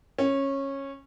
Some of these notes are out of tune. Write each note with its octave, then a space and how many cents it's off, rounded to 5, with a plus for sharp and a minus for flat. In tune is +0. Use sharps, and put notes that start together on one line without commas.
C#4 -15